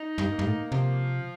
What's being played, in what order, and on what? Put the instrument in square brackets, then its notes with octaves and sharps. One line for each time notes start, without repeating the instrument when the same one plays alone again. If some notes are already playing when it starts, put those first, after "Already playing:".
Already playing: [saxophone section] D#4
[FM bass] G2
[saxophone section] A#3
[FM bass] G2
A2
[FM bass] C3 [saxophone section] F3